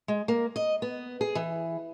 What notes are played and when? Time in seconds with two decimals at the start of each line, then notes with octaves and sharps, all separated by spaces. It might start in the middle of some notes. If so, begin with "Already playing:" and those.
0.08 G#3
0.28 A#3
0.56 D#5
0.82 B3
1.21 G#4
1.35 E3